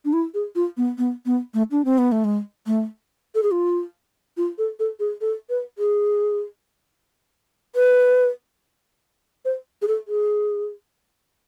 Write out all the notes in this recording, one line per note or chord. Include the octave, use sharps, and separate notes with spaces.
D4
E4
G#4
F4
B3
B3
B3
A3
D4
C4
B3
A3
G#3
A3
A4
G#4
F4
F4
A4
A4
G#4
A4
B4
G#4
B4
C5
G#4
A4
G#4